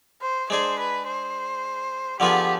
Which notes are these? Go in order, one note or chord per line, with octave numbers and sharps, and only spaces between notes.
C5
G#3 D4 G#4 C5
B4
C5
D3 F3 B3 F4 G4 G#4